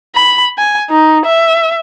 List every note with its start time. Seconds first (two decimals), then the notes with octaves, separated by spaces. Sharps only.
0.15 B5
0.58 G#5
0.90 D#4
1.25 E5